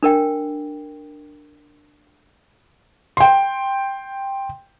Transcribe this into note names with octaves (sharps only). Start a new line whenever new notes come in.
D4 A#4 G5
G5 C6